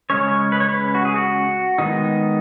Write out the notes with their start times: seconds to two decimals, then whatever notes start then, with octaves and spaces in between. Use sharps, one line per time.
0.10 C#3 G#3 C#4 C#5
0.52 B4
0.60 C#5
0.68 B4
0.95 F#4
1.05 G#4
1.16 F#4
1.78 D#3 G#3 B3 D#4